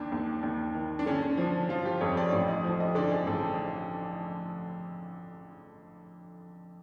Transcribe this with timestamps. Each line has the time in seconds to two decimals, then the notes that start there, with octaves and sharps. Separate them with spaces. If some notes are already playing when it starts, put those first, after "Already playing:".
Already playing: D#2 D4
0.12 D#2
0.43 D#2
0.75 D#3
0.99 D4
1.06 D3 C#4
1.23 C#4
1.37 F3 D4
1.69 F3 F4
1.85 G4
2.01 F2 C#5
2.17 D5
2.33 A1 D5
2.48 D#5
2.64 F3
2.80 D#5
2.95 D3 D5
3.11 G#4
3.26 A1 A4